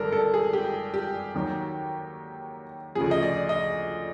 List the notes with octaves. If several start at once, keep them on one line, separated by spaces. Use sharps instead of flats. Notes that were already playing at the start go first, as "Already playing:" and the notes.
Already playing: G#1 G2 D3 A4 A#4
A4
G#4
G4
G4
D#2 D#3 F#3
D2 C#3 F3 G#4
D#5
D5
D#5